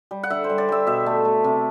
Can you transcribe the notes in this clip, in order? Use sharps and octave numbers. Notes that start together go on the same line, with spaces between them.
G3
F#5
D3 E5
C5
G3
D5
G3 E5
B2 E5
A3
A3
C3